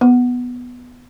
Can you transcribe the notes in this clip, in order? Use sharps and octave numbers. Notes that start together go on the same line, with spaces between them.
B3